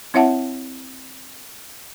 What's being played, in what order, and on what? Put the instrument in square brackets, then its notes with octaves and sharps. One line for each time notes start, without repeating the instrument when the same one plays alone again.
[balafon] C4 E4 C#5 E5 F#5 A5